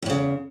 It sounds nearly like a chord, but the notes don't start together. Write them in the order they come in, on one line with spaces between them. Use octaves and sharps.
E2 A2 C#3